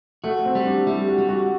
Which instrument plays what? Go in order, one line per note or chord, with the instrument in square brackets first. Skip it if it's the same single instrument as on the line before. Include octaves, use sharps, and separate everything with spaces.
[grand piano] A3 [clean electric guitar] F#4
[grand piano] C4
[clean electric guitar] G3
[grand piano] D4
[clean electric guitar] G3 [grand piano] E4
[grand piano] F#4
[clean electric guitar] G3
[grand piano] F#4